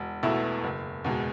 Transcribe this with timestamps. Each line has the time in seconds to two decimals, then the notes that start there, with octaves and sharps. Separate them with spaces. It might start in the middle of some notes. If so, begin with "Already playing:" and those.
Already playing: E1
0.23 E2 B2 A3 E4
0.64 F#1
1.05 E2 B2 G#3